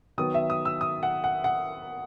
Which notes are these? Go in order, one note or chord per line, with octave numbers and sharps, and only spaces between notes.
D#3 F#3 B3 D#6
E5
D#6
E6
D#6
F#5
F#5
F#5